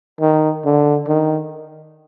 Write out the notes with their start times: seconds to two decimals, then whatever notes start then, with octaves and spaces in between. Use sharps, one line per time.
0.21 D#3
0.65 D3
1.08 D#3